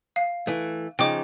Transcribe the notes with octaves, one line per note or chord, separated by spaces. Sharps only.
F5
E3 A3
C#3 F3 D#4 G5 D6